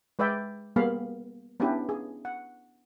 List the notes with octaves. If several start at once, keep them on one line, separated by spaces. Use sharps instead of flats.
G#3 B4 D5 E5 G5
G3 A#3 B3 G#4 F5 B5
B3 C#4 D4 E4 G4 B4
G#4
F#5